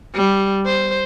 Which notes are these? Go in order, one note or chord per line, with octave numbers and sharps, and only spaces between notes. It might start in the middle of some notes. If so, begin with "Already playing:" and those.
G3
C5